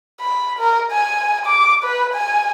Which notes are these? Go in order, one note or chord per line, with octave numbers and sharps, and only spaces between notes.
B5
A#4
G#5
D6
B4
G#5